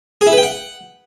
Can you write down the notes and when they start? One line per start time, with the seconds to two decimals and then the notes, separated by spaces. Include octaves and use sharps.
0.21 G#4
0.27 E4
0.32 B4
0.37 G5
0.43 F#5